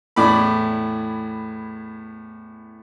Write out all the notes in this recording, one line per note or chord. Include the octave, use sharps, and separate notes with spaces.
E2 A2 D5 B5